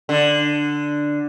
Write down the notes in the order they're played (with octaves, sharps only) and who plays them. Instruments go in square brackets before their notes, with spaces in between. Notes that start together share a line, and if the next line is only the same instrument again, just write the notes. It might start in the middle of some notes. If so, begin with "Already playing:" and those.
[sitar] D3